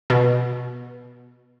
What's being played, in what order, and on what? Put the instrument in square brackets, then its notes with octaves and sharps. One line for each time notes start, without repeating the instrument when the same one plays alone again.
[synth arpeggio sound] B2